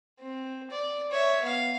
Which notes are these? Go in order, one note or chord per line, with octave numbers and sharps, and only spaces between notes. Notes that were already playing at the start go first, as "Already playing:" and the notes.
C4
D5
C#5 E5
B3 F5